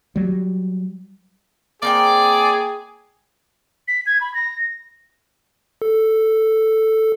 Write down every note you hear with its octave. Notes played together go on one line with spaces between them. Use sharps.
F#3 G3
A#3 C4 G#4 D5 G5
B6
G#6
B5
A#6
A4